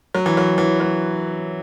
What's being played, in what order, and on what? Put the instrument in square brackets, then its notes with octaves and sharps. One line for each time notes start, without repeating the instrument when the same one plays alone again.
[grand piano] F#3
E3
F#3
E3
F#3